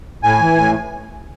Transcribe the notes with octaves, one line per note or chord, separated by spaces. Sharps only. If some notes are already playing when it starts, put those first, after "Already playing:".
A2 G#5
E3
A2